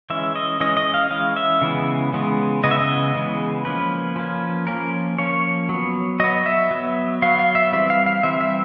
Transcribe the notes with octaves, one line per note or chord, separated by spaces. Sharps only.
E3 G#3 C#4 E5
D#5
E3 G#3 C#4 D#5
D#5
F5
E3 G#3 C#4 F5
E5
C#3 E3 G#3 B3
C#3 E3 G#3 B3
C#3 E3 G#3 B3 D#5
E5
D#5
C#3 E3 G#3 B3
F3 A#3 C#4 B4
F3 A#3 C#4
F3 A#3 C#4 A#4
F3 A#3 C#4 C#5
F#3 B3
F#3 B3 D#5
E5
F#3 B3
F#3 B3 F5
F5
E5
E3 G3 C4 E5
F5
F5
E3 G3 C4 E5
E5